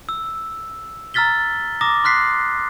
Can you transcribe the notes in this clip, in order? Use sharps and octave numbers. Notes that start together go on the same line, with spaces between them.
E6
A#5 E6 F6 A6 B6 G7
A#5 D6 D#6 A#6
C6 F6 F#6 B6 C7